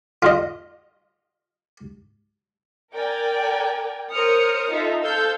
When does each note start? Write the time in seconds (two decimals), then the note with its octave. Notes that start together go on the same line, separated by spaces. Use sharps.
0.22 F4 D#5
2.94 A#4 D5 G5 G#5
4.11 A#4 C5 C#5 D#6 F6 C#7
4.70 D#4 F4 A4 E5
5.01 A4 C5 F5 E6 G6